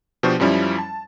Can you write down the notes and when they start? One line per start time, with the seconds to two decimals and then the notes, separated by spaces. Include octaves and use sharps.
0.23 B2 F3 D4 G4 C5 C#6
0.40 F#2 F3 G3 C#4 E4
0.79 A5